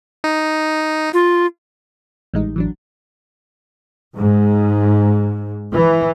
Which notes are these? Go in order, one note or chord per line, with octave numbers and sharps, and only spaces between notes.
D#4
F4
A1 G3 G#3 D#4
E3 F#3 D4
G#2
E3